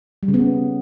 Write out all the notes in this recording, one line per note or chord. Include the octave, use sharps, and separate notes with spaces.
G3
C#3
B3
C#4